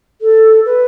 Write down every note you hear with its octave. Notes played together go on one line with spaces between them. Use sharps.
A4
B4